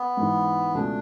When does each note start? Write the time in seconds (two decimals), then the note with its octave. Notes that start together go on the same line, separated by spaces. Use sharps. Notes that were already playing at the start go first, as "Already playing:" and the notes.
Already playing: B3
0.17 G#2 E3 G#3
0.75 C#2 B2 A3 D4